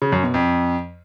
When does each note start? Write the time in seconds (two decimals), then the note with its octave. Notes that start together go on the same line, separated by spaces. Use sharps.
0.02 C#3
0.12 F#2
0.23 B2
0.34 F2